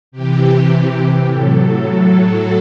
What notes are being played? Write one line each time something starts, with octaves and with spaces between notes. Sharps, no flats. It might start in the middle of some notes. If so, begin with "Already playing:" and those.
C3 E3 G4
A2 F#3 A4